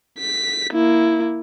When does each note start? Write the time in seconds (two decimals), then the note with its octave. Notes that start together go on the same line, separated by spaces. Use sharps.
0.19 B6
0.73 A#3 E4